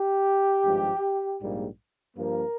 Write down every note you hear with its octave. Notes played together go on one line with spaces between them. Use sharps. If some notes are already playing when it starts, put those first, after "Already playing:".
Already playing: G4
G#1 G2 F3 G#3
A#1 G#2 G3 A#3
G2 F3 A#3 A#4